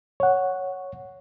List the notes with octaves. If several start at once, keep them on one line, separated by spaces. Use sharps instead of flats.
C#5 F#5